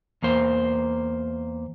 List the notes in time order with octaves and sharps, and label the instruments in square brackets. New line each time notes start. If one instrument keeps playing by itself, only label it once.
[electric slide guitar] E2 A#3 C5